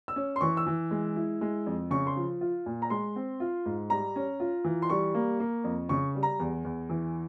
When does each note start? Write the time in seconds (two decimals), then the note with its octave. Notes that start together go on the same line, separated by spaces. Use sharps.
0.08 E6
0.16 C#4
0.36 C6
0.41 E3 C#6
0.57 E6
0.66 E3
0.91 G#3
1.16 E4
1.41 G#3
1.66 F2
1.91 C#3 C#6
2.07 C6
2.16 F3
2.41 F4
2.66 A#2
2.82 A#5
2.90 G#3 C6
3.16 C4
3.40 F4
3.66 G#2
3.90 G3 A#5
4.16 C#4
4.40 F4
4.64 E3
4.82 C6
4.90 G3 C#6
5.14 A#3
5.40 A#3
5.64 F2
5.89 C#3 C#6
6.15 G3
6.23 A#5
6.39 E2
6.65 E2
6.89 E3